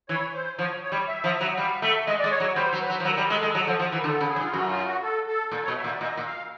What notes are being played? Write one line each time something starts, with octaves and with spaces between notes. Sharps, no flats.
E3 C#5
C5
F3 C#5
C#5
G3
E5
F3
F#3
G3 F5
A3 E5
G#3 D#5
D5
G#3
C#5
F#3
C#5
G3 C5
F#3
B4
F#3
F3
F#3 A#4
G3
G#3 A4
G#3
F#3
F3
F3
E3
A#4
D3 A4
C#3
G#4
G2
F4
F#2 F#4
F4
F#4
A4
A4
A#2 A4
B2 C#5
E5
A#2
D5
A#2 D#5
A#2
F5